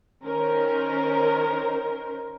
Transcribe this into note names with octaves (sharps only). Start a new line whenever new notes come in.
D#3 C#4 A#4 C5